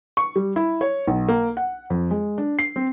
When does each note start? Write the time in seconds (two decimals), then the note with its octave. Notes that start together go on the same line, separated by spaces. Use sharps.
0.17 C#6
0.36 G3
0.56 E4
0.81 C#5
1.08 B1
1.29 A#3
1.57 F#5
1.90 F2
2.11 G#3
2.38 D4
2.59 C7
2.76 C4